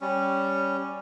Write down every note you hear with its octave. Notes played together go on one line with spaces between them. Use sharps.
G3 C#4